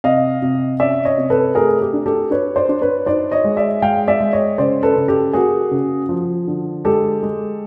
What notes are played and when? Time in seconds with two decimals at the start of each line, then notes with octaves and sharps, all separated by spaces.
0.04 C3 D#5 F5
0.42 C3
0.80 C#4 D5 E5
1.05 C#5 D#5
1.18 C3
1.30 A4 B4
1.55 A3 G#4 A#4
1.81 G4
1.93 D4
2.06 G4 A4
2.31 D4 B4 C#5
2.56 C5 D5
2.69 D4
2.81 B4 C#5
3.06 D#4 C5 D5
3.31 C#5 D#5
3.44 G#3
3.57 D5 E5
3.82 G#3 F5 G5
4.08 D5 E5
4.20 G#3
4.33 C#5 D#5
4.58 C#3 C5 D5
4.83 A4 B4
4.96 C#3
5.08 G4 A4
5.33 A#3 F#4 G#4
5.71 C#3
6.09 F3
6.47 D3
6.85 G#3 G4 A4
7.23 G#3